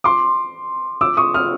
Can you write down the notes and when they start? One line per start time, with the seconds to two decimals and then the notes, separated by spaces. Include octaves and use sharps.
0.04 C6 D6
1.01 D6 E6
1.17 C#6 D#6
1.34 D#6 F6